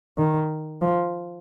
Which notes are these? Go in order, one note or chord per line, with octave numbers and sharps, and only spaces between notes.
D#3
F3